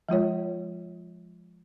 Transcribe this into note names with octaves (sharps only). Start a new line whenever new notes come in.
F3 G#3 F4 C#5